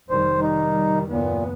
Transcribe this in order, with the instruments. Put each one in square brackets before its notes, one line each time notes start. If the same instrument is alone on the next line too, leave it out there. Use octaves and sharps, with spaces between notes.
[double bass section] F1 D#3 G3 [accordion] C5
[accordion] D#4
[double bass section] F#1 D#2 B3 [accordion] A#2